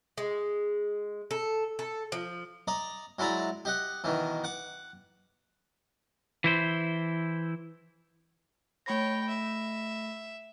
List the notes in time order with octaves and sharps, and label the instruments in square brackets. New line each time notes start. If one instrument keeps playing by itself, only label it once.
[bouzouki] G#3
A4
A4
F3
[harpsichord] D5 D#5 A#5
F#3 G#3 E4 D5 A#5
G4 D#5 F#5
B2 D#3 E3
F#5 D6
[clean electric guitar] E3 E4 C5
[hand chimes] A3 B5 A#6 [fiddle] C#5 G5
[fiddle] E5